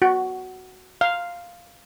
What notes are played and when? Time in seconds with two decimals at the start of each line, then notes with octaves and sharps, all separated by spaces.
0.02 F#4
1.01 F5